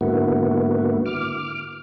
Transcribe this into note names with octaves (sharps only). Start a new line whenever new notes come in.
G#2 D3 A#3 B3 E4 F#4
D6 F6